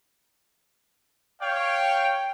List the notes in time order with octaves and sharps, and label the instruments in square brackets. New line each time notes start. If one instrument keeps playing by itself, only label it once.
[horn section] C#5 F5 G5